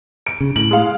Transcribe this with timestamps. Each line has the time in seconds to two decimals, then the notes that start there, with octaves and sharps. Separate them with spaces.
0.26 D7
0.41 C#3
0.56 A2 F#7
0.71 G#3 F5